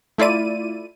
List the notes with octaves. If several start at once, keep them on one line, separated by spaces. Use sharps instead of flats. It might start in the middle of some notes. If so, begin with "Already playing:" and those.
A3 E4 F4 D5 D#7